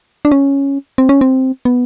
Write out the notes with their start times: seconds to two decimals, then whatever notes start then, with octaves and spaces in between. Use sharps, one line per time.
0.25 D4
0.32 C#4
0.98 C4
1.09 C#4
1.21 C4
1.65 B3